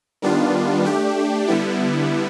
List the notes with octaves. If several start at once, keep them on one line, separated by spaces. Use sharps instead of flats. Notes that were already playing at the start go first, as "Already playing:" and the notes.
D#3 G3 B3 D4 F4
A3 D4 G4
D3 G3 B3 E4